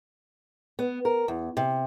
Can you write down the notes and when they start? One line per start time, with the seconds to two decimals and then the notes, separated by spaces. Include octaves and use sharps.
0.79 B3
1.05 A#4
1.28 E2
1.57 C3